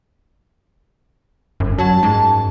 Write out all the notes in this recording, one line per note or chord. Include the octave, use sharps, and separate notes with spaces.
G1 F#2
F#3 A5
G#2